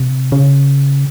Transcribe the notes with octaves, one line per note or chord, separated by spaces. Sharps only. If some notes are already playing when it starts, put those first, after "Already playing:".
Already playing: C3
C#3